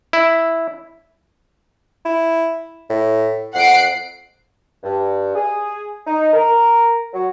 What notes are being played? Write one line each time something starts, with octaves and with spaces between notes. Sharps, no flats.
E4
E4
A2
F2 F#5 C7 D7
G2
G#4
D#4
A#4
F#3